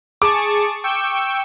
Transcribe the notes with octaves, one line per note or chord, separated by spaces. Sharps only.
G#4 A5 C#6 D6
G5 C#6 E6